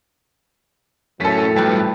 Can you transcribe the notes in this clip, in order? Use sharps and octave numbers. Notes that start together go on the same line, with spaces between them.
F#2 A2 F#3 C#4 A4 B6
G2 F3 G3 B4 G5